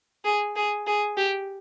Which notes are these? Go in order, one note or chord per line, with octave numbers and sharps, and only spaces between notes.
G#4
G#4
G#4
G4